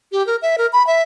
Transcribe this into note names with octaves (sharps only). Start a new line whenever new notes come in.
G4
A#4
E5
A#4
B5
E5